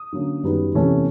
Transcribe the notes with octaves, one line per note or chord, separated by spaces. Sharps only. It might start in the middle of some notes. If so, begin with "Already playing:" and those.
Already playing: D#6
D3 F#3 A#3 C#4
F#2 D#3 G3 B3
E2 C3 E3 A3 C#4